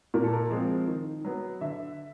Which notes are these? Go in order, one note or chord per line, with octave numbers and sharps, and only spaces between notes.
A#2 A#4
A4
A#4
F3 G#3 C4
D#3
F#3 B3
D3 E5